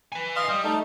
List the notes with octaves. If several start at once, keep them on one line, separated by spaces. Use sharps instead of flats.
B4 G#5
D#5 F5 C6
G3 D#5
A3 D#4